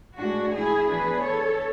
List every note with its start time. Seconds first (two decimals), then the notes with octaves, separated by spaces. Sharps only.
0.16 A2 G#3 D4 F#4
0.51 E4 G#4
0.87 E3 B3 D4 G#4 B4
1.22 A4 C#5